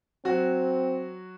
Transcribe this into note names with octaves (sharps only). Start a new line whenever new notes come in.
F#3 C4 F#4